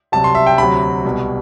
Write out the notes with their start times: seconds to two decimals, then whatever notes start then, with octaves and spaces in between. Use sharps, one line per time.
0.12 C2 C3 F#3 A5
0.24 C6
0.35 E5
0.47 G5
0.58 D2 C3 F#3 B5
1.05 C2 B2 G3